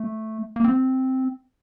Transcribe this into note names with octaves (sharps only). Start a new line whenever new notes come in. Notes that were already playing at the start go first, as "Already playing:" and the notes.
Already playing: A3
A#3
C4